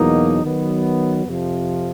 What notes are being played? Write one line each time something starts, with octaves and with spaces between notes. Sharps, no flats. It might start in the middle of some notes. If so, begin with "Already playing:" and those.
Already playing: E2 B2 F#3 A#3 D#4
D#3 F#3 B3
F2 C3 F3